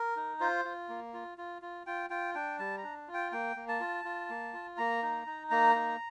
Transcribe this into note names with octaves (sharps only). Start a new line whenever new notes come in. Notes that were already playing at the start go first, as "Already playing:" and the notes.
Already playing: A#4
D#4
F4 C5
F4
A#3
F4
F4
F4
F4 G5
F4 G5
D4 G5
G3 A5
A#5
D4
F4
G5
A#3 G5
A#3
A5
F4
F4
A#3
F4
A#3 A#5
D#4
D#4
A#3 A#5
D#4